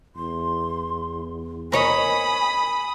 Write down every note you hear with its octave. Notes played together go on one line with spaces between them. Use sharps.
E2 C6
A#4 C#5 D#5 G#5 B5 D#6